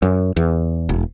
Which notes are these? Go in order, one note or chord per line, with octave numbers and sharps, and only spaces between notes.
F#2
E2
E1